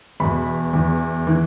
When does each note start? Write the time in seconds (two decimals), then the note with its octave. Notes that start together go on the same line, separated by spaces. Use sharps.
0.20 E2 B2 B5
0.73 E2 E3
1.27 E3